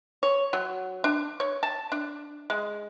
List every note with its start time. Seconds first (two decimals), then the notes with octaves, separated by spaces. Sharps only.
0.23 C#5
0.53 F#3
1.04 D4
1.40 C#5
1.63 A5
1.92 D4
2.50 G#3